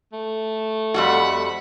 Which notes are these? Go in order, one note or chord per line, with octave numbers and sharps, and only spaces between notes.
A3
F2 G3 F#4 F#5 B5